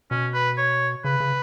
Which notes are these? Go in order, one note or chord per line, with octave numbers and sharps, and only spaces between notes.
B2 C#4
B4
C#5
C#3 B4
C#3